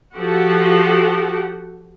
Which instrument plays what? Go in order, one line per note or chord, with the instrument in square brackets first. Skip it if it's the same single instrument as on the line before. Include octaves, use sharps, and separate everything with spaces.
[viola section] F3 F#4 G4 A4 F#5